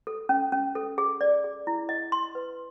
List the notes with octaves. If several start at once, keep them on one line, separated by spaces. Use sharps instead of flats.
A4
C#4
C#4
A4
G#4
D5
G#4
E4
D#5
C6
B4